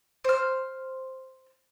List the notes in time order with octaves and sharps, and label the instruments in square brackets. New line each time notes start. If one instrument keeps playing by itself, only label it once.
[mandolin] C5 F6